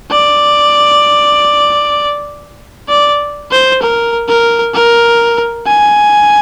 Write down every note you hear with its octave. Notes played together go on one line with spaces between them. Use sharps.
D5
D5
C5
A#4
A#4
A#4
G#5